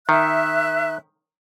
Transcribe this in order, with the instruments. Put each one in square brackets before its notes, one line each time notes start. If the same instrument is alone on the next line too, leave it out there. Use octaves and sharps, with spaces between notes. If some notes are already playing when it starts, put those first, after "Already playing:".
[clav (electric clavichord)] D#3 [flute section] E5 F#6